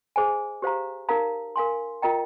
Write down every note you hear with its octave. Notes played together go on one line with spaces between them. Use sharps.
G#4 C5 D#5 G#5
G4 C5 F5 A#5
D#4 A#4 F5 A#5
A#4 F5 G#5 C6
F4 A#4 D#5 G5 A#5